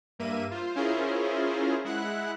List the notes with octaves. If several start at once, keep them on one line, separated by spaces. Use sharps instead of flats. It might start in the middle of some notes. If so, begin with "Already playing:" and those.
G2 A#3 E5 D#7
F4 C5
C#4 E4 F4 G#4 A#4 C5
G#3 E4 F#5 F#6